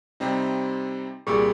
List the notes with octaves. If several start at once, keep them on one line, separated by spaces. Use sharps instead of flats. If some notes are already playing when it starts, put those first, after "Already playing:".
C3 G3 C4 D#4
C2 A#2 G3 G#4